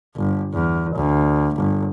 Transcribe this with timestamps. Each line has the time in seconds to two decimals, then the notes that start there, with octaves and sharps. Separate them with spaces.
0.17 G1
0.53 E2
0.95 D2
1.56 G1